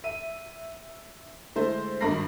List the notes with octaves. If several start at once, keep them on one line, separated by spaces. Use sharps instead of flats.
E5 D#7
D3 G#3 A3 E4 C5
G#1 G2 A#4 B5 A#6 C7